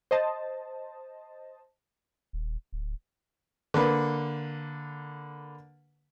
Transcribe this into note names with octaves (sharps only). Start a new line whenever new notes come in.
C5 D#5 A5
D#1
D1
D3 A#3 B4